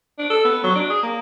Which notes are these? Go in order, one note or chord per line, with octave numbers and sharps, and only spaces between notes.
D4
A4
B3
F#3
D4
G#4
A#3